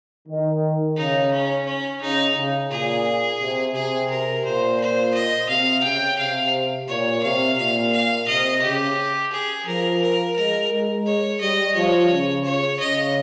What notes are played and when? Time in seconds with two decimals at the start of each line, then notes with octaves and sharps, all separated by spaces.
0.28 D#3
0.97 C#3 D#4
1.32 C#4
1.66 C#4
2.01 C#3 D#4
2.36 C#3
2.70 A#2 G#4
3.41 C3
3.75 C3 G#4
4.10 A#4
4.45 A#2 C5
4.80 C5
5.15 D#5
5.49 C3 F5
5.84 C#3 G5
6.19 C3 F5
6.88 A#2 C#5
7.23 C3 F5
7.58 A#2 F5
7.93 F5
8.28 C3 D#5
8.62 C#3 G4
9.32 G#4
9.66 F3 A#4
10.01 A#4
10.36 G#3 A#4
10.70 G#3
11.06 C#5
11.40 G3 D#5
11.75 F3 C#5
12.10 C#3
12.45 C#5
12.80 C#3 D#5